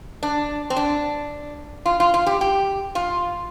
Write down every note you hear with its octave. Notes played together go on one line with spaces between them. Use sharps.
D4
C4
D4
F4
F4
F4
G4
G4
F4